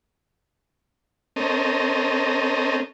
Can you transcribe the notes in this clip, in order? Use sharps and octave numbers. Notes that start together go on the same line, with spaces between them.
C4 C#4 A4 A#4 D#5